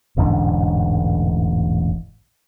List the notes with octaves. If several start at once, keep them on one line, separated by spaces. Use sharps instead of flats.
E1 A1 G#2 D3